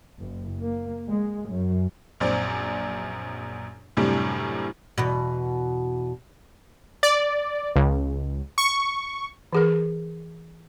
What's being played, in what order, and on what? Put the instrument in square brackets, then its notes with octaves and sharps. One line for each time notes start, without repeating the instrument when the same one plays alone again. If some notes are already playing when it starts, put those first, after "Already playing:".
[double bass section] F#1
A#3
G#3
F#2
[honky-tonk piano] A#1 F#2 C4 D5
F#2 A2 C3 G3 D4
[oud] E2 B2
[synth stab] D5
C#2
C#6
[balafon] E3 G#4 A#4